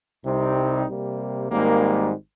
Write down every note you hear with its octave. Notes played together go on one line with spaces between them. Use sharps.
C2 C3 G3 C4 D#4
C3 G3 A#3
G#1 G#2 G3 A#3